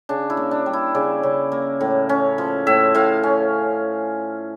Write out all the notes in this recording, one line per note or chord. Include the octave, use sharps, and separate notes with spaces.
C#3 D4
E4
A#3
D4
G3
E4
C#3 D5
C#3
A#3
A2
C#4
F3
A2 E5
A2 F5
C#4